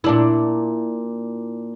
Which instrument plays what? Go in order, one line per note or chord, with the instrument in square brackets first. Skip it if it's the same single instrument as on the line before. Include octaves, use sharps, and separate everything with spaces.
[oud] A#2 D4 E4